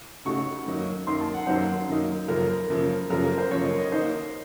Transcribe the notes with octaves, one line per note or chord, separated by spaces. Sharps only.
C#3 A3 D#4 F#4 A4 C#6
F#2 D#3 F#3 A#3 D#4
F#2 D#3 F#3 A#3 D#4 C6
A5
F#5
F#2 D#3 F#3 A#3 D#4 C5
F#2 D#3 F#3 A#3 D#4
F#2 C#3 F3 A#3 A#4
F#2 C#3 F3 A#3
F#2 C#3 F3 A#3 A#4
A#4
C5
F#2 C#3 F3 A#3 C#5
D#5
D#5
D#3 A#3 D#4 C5